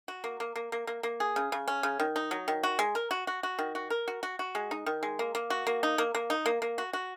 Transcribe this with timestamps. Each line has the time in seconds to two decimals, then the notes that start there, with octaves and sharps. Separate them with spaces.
0.08 F#4
0.24 A#3
0.40 A#3
0.56 A#3
0.72 A#3
0.87 A#3
1.03 A#3
1.20 G#4
1.36 C#3
1.52 C#3
1.68 C#4
1.83 C#3
2.00 D#3
2.16 D#4
2.31 F#3
2.48 D#3
2.63 F#4
2.79 G#3
2.95 A#4
3.11 F#4
3.27 F#4
3.43 F#4
3.59 D#3
3.75 F#4
3.90 A#4
4.08 F#4
4.23 F#4
4.39 F#4
4.55 G#3
4.71 D#4
4.86 D#3
5.03 G#3
5.19 A#3
5.35 A#3
5.50 F#4
5.67 A#3
5.83 D#4
5.98 A#3
6.15 A#3
6.30 D#4
6.46 A#3
6.62 A#3
6.78 F#4
6.93 F#4